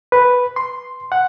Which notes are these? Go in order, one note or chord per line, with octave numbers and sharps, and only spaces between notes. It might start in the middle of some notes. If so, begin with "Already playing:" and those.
B4
C6
F#5